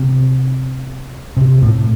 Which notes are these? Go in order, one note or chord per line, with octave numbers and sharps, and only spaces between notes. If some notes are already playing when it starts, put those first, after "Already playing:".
Already playing: C3
C3
A2